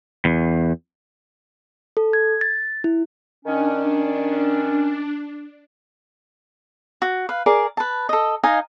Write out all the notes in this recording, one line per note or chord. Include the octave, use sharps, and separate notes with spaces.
E2
A4
G#6
A6
E4
D#3 C#4 D4
F#4
B4 F5
G#4 A#4 D5
B4 A5
A4 D#5
D#4 D#5 F5 G#5